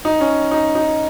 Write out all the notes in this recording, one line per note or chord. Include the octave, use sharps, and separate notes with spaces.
D#4
C#4
D#4
D#4